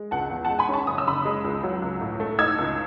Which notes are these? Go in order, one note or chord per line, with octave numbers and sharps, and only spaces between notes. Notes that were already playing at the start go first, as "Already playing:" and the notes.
Already playing: G#3
C#2 F#5 A5
E2
F#5 A5
G#3
G#5 B5
C#4 A5 C#6
F#1 D#6
E6
C#3 B5 D#6
G#3
C#2
F#3
C#2
A2
A3
D#4 E6 G#6
C#2